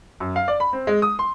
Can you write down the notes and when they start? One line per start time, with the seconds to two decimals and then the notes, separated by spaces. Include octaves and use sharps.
0.20 F#2
0.36 F5
0.48 D5
0.60 B5
0.73 C4
0.87 G#3
1.02 D#6
1.19 C6